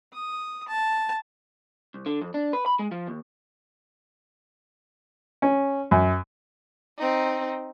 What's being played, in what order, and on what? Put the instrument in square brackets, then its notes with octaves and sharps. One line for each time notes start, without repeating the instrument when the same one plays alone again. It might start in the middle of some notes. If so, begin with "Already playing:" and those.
[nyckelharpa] D#6
A5
[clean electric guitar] C2
D3
F2
D4
B4
B5
G#3
F3
D#2
[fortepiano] C#4
F#2
[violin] C4 D#4